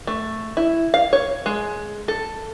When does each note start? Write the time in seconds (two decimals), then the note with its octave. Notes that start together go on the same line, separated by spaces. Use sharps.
0.07 A3
0.57 E4
0.94 F5
1.13 C#5
1.46 G#3
2.08 A4